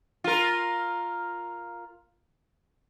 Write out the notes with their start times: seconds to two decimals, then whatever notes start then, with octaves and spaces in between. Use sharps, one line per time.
0.24 F4 A#4